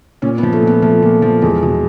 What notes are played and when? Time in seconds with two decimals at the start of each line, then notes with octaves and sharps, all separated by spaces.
0.22 A#2 C#4
0.38 B3
0.43 F3
0.52 A3
0.62 A#2
0.67 B3
0.82 F3 A3
1.02 A#2
1.22 F3
1.42 E2 G#3
1.63 B2